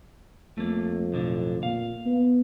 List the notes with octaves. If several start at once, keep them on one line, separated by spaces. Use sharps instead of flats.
F2 A3 A#3
B1 A2 D3
A#2 F5
B3